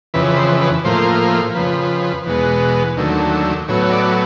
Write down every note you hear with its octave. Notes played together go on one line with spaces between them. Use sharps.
F2 C#3 E3 B4
B4
C5
B4
A2 F3 A#3 C5
F2 C#3 F3 B4
E2 B2 G#3 B3
D#2 D3 F#3 A3
A2 F#3 B3 C#5
C#5
D5